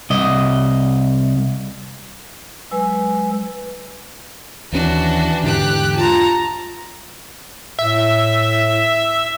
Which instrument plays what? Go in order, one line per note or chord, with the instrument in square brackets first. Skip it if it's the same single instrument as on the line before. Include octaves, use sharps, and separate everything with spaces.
[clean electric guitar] C2 D#5
[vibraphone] F#3 G#3 B4 G#5 E6
[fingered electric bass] D#2 C#4 [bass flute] E3 [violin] D4 F#4
[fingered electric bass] E2 G#2 D3 [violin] G4 F#6
[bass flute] F4 [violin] A5 A#5
[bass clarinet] A2 [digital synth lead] E5